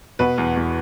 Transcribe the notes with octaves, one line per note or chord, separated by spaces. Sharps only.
B2 B4
E2
E2